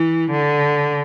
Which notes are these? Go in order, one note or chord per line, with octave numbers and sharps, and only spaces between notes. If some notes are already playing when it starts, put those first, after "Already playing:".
Already playing: E3
D3